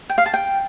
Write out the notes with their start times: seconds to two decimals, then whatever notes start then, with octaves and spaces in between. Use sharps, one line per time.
0.09 G5
0.18 F5
0.26 A5
0.34 G5